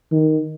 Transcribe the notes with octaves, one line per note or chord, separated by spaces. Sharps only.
D#3